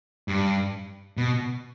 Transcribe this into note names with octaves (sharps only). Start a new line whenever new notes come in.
G2
B2